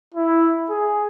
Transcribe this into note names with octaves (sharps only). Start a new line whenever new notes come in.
E4
G#4